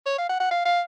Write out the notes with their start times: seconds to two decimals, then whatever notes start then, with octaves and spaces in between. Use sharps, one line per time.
0.06 C#5
0.18 F5
0.29 F#5
0.40 F#5
0.51 F5
0.65 F5